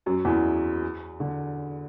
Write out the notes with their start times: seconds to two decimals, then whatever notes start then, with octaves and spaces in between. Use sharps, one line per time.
0.06 F#2 F#3
0.25 E2 E3
1.20 D3